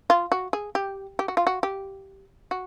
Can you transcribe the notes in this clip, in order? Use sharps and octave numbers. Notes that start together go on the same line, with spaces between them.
F4
F#4
G#4
G4
G4
F#4
F4
F#4
G4
F#4